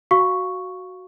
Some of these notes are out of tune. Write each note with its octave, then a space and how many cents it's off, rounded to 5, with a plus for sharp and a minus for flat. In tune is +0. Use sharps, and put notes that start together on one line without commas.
F#4 +0 F5 +0 C#6 +0